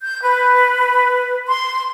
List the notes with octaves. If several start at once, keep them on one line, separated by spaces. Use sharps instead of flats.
G6
B4
C6